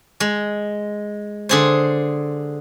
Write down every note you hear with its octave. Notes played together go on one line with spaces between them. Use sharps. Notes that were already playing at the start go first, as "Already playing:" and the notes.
G#3
D3 G#4 C5